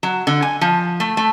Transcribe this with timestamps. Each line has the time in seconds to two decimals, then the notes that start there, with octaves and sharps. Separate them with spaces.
0.03 F#3
0.27 D3
0.42 G#5
0.61 F3
1.00 A3
1.17 A3